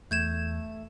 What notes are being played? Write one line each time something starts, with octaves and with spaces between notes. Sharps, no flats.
E2 A3 G6 G#6 E7